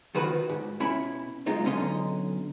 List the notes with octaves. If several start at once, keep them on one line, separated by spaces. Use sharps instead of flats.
D#3 F3 F#4 B4
G#2
B2 C#4 E4 B5
B1 G#3 D#4 F4
B1 D3 C#4 D#4 C6